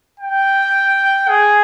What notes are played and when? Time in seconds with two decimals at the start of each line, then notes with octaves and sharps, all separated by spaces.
0.20 G5
1.29 G#4